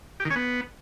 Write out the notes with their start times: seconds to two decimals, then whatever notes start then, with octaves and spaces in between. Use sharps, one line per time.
0.20 G4
0.25 D#3
0.30 C#4
0.36 B3